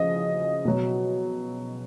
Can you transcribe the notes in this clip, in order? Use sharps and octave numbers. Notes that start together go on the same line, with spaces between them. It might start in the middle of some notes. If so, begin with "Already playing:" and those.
Already playing: C#3 F3 D#5
B2 F#3